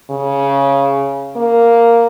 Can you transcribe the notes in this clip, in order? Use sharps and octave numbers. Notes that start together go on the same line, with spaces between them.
C#3
A#3